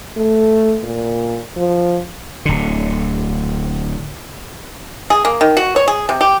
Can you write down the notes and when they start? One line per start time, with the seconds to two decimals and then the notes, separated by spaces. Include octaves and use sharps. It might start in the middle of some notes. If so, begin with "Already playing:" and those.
0.17 A3
0.83 A#2
1.57 F3
2.45 D1 D3
5.10 G#4
5.25 A#3
5.41 D#3
5.57 F#4
5.76 C#5
5.88 G#4
6.09 C3
6.21 G4